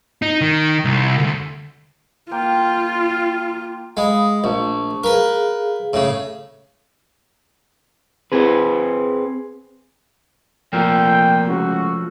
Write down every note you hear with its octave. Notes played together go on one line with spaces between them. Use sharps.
D#4
D#3
C2
D2
A#3 F4 G5
G#3 F5 B5 D#6
A#1 A3 C#6
G#4 A#4 B4 F5
A2 C#3
C4 G#4 B4
A#2 F3 A3 G5
C#2 F#4